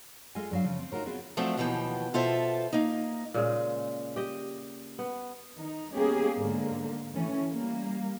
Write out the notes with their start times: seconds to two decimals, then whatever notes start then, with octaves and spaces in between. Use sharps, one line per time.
0.35 G#3 F4 A4 D#5 G#5
0.51 G2 F#3 F5
0.64 C#3 F3
0.79 C4
0.92 D#4 F4 F#4 A#4 C#5
1.06 B3 C4 F4 F#4 G#4
1.37 F3 F#3 A3 C4 D4
1.57 D#2 B2 E3 F3 G5
2.14 B2 F4 A4 C5 E5
2.73 A#3 D#4
3.34 A#2 C#3 G#3
4.16 G4 D#5
4.99 B3
5.56 D#3 D#4
5.94 G#3 A#3 B3 C#4 G4 G#4
6.37 G#2 D3 A#3
7.15 E3 A3 C#4
7.48 G3 A#3